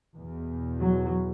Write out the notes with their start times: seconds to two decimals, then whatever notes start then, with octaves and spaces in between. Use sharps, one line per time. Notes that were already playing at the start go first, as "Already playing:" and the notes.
0.17 E2 B2
0.81 F#3